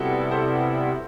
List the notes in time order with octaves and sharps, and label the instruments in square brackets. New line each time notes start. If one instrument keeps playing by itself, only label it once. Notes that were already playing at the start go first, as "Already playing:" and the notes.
Already playing: [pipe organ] C3 G3 B3 E4 [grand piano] F#4 A4
[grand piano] A4 C5